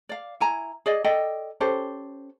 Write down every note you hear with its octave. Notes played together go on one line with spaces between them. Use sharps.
D5 F5
E4 G#5 A#5
G#4 D5 D#5
A4 D5 D#5 G5
C#4 G4 A4 C5